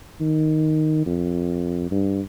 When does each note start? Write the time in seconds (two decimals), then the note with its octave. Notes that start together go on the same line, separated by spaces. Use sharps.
0.20 D#3
1.06 F2
1.91 G2